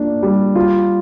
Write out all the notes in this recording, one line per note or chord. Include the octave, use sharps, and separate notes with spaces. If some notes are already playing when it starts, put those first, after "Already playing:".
Already playing: A#3 D4 F4
G3
F4